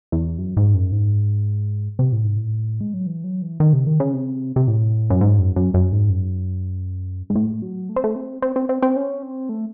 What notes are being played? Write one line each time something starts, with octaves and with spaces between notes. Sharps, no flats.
E2
F#2
G#2
F#2
G#2
C3
A2
G#2
A2
G#3
F#3
E3
F#3
E3
D#3
C3
D#3
C#3
C3
C3
A2
F#2
G#2
F#2
F#2
F#2
G#2
F#2
G#2
A2
F#3
A3
C4
A3
C4
C4
C4
C4
C4
C#4
C4
A3